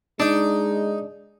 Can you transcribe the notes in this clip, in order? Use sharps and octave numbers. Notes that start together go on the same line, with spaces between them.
G#3 D4 D#4